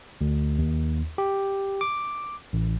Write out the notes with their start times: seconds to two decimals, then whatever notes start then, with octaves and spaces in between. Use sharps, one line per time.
0.21 D2
0.59 D#2
1.18 G4
1.81 D6
2.53 A1